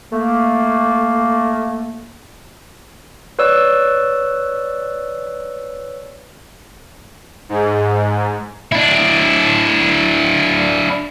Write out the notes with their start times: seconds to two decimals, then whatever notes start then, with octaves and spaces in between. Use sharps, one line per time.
0.12 A3 A#3
3.39 B4 C#5 D5 E6
7.49 G#2
8.72 D4 E4